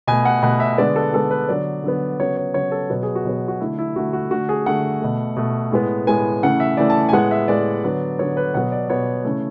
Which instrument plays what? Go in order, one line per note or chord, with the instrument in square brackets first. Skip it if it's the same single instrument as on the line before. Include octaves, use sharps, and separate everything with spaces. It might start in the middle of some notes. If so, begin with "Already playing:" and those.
[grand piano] B2 A3 G#5
F#5
B2 A3 F#5
E5
D3 G#3 B3 D5
A4
D3 G#3 B3 A4
B4
D3 F#3 B3 D5
D3 F#3 B3
C#3 F#3 B3 C#5
C#5
C#3 F#3 B3 C#5
A4
B2 F#3 B3 F#4
G#4
F#4
B2 F#3 B3
F#4
D3 A3 E4
E4
D3 A3 F#4
F#4
D3 A3 F#4
G#4
D3 A3 F#5
B2 A3
B2 A3
A2 G#3 B3
A2 G#3 B3 G#5
C#3 E3 A3 F#5
E5
C#3 E3 A3 D5
A5
G#5
A2 G#3 B3 F#5
E5
A2 G#3 B3 D5
D3 F#3 B3
D3 F#3 B3 C#5
B4
B2 F#3 B3 F#5
D5
B2 F#3 B3 C#5
C#3 E3 A3